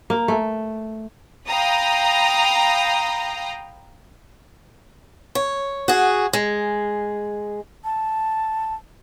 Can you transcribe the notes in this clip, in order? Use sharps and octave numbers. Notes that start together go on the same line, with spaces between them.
A#3
A3
F5 G5 A#5 B5 D#6
C#5
F#4 G#4
G#3
A5